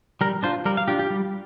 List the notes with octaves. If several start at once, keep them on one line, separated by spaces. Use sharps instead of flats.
G3 A#4
D4 F4 C5
G3 A#4
F5
D4 F4 G4
G4
G3